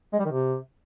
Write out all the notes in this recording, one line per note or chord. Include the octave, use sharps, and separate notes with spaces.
G#3
G3
D#3
C3